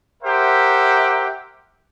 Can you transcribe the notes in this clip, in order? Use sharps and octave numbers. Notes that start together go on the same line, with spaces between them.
G4 A#4 C5 E5 F#5